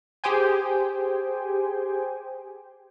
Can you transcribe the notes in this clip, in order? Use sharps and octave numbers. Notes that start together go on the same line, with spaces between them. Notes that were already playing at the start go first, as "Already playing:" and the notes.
G4 G#4 C5 G5 G#5